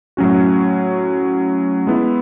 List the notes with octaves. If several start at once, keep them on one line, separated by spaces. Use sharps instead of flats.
A2 F#3 C#4 F#4
G#3 B3 E4